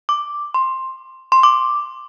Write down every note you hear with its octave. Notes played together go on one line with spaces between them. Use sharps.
D6
C6
C6
D6